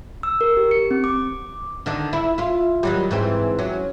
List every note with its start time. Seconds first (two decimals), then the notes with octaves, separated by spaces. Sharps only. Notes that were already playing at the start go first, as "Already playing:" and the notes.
0.23 E6
0.41 A#4
0.57 G4
0.71 C#7
0.91 C4
1.04 D6
1.86 D3 D#3 D4
2.13 E4
2.38 E4 F4
2.83 D#3 F#3 G3
3.11 G#2 E3 C4
3.59 F#3 C#4